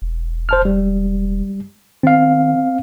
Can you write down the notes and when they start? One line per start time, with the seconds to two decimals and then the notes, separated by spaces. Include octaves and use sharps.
0.02 E1
0.49 C5 A5 F6
0.65 G3
2.03 D#3 C4 F5